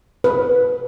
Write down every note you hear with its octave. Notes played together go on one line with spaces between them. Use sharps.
B4